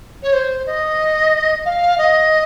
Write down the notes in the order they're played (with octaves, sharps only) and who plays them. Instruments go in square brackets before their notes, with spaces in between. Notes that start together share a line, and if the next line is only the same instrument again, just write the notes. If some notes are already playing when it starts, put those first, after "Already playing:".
[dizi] C#5
C5
D#5
F5
D#5